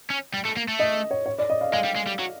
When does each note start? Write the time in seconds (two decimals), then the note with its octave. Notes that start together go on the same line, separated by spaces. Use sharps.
0.10 C#4
0.34 G3
0.45 A3
0.57 A#3
0.68 A3
0.79 D#5
1.11 C#5
1.26 C#5
1.38 D5
1.50 D#5
1.61 F5
1.72 G#3 F5
1.84 G3
1.96 G#3
2.07 G3
2.19 F#3